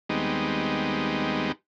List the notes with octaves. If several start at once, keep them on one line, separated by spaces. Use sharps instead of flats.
D#2 G3 G#3 B3 C4 D#4